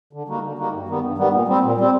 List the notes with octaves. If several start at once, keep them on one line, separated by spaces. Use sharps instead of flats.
D3
G3 A#3 D#4 F#4
D3
G3 A#3 D#4 F#4
G2
D#3 G3 B3
G2
D#3 G3 B3
A#2
G3 C4
A#2
G3 C4